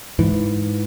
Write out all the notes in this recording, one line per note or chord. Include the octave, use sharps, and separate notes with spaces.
G#2 E3